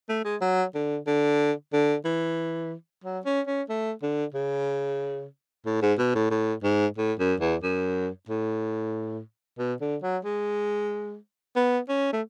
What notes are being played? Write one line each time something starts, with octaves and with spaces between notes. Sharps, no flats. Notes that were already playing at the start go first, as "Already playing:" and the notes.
A3
G#3
F#3
D3
D3
D3
E3
F#3
C#4
C#4
A3
D3
C#3
A2
G#2
B2
A2
A2
G#2
A2
F#2
E2
F#2
A2
B2
D3
F#3
G#3
B3
C#4
A3